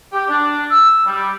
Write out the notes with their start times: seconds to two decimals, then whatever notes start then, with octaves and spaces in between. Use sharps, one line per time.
0.13 G4
0.29 D4
0.71 E6
1.07 G3